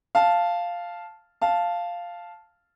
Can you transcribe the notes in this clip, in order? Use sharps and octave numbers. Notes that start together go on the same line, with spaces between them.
F5 A5
F5 A5